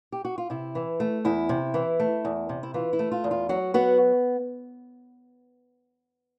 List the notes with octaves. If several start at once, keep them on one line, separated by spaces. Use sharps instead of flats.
G4
F#4
F4
C3 E4
E3
A3
E2 E4
C3
E3
A3
E2
C3
E4
E3 F4
E4
A3
F4
E2
F4
F#3 F#4
B3 F#4